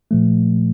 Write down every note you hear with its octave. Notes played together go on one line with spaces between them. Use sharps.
A#2 F3 A3